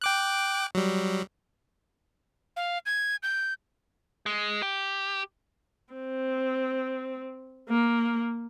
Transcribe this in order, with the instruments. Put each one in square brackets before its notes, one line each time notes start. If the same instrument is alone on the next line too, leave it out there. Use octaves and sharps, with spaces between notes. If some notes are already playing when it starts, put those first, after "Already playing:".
[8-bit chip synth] G5 D6 F#6
F#3 G3
[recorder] F5
G#6
G6
[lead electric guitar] G#3
G4
[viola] C4
A#3